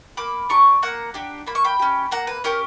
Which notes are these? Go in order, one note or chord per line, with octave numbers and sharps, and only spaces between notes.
A#3 B5 D6
D4 G4 A#5 C#6
A#3 F#5 A#5
D4 G4
A#3 B5
C#6
G5 B5
C#4 G4
A#3 F#5 A#5
B4
C#4 G4 A#4